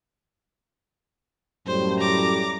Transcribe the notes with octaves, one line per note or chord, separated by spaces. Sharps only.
F#2 A2 G3 C5
A#5 D6